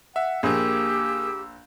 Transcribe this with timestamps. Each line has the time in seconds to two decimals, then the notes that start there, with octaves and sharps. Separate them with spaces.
0.16 E5 F#5
0.43 A#1 A#3 G4 G#4 E6